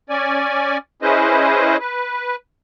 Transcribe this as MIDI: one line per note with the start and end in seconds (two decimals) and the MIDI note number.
0.10 0.78 61
0.10 0.78 74
0.10 0.78 80
1.02 1.77 61
1.02 1.77 64
1.02 1.77 68
1.02 1.77 71
1.02 1.77 72
1.02 1.77 75
1.80 2.36 71